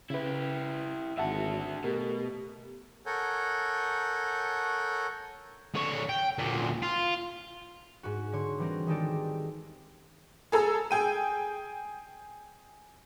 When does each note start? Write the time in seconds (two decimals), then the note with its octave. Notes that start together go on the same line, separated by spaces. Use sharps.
0.10 C#3 E4 G4 B4
1.18 G#1 D3 F#4 E5 F#5 A5
1.84 B2 A3 G4 A#4
3.06 A4 A#4 C#5 F#5 G#5 G6
5.75 D3 C#5
6.09 G5
6.38 D2 A#2
6.83 F4
8.03 G#2 F#4
8.33 D3 C#5 C6
8.59 E3 G3 C4 A#4
8.87 D#3 G#3 D#4 G4 A4 D5
10.52 G#4 A4 A#5 E6
10.91 G#4 G5 D#7